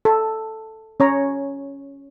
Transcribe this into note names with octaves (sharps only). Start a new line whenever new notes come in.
A4
C#4 C#5 A#5